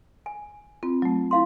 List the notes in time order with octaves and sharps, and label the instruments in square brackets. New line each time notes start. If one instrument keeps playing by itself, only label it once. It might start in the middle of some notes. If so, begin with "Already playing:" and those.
[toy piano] G#5
[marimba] C4 [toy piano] F4
[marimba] F#3 A3
[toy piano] E4 F5 C6